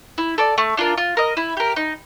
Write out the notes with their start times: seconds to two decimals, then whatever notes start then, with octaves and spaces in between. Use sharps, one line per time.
0.18 E4
0.38 A4 D5
0.58 A3
0.77 D4 F4 A#4
0.98 F4
1.17 A#4 D#5
1.37 E4
1.57 G4 A#4
1.76 D#4